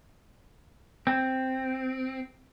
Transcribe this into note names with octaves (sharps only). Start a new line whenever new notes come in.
C4